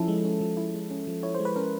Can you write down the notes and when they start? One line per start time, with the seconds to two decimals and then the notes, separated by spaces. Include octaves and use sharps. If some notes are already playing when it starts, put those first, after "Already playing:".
Already playing: F3 C#4 E4 A4
0.08 G#3
0.24 C#4
0.41 F3
0.57 E4
0.74 G#3
0.90 C#4
1.07 F3
1.23 E4 C#5
1.35 G#3 C5
1.45 B4
1.56 C#4 A#4